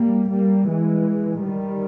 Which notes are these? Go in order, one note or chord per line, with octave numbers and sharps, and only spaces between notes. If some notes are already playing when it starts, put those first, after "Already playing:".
Already playing: G3 A#3
G3 A#3
E3 G#3
D#3 G3